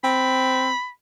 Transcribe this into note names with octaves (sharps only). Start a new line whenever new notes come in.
C4 B5